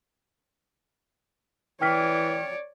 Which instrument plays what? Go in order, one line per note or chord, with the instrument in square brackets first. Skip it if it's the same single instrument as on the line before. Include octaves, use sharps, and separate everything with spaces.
[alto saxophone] E3 [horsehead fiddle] C#5 D5 [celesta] G5 F6 B6